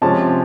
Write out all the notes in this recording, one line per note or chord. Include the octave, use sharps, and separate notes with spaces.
C3 F3 G#3 C#4 A5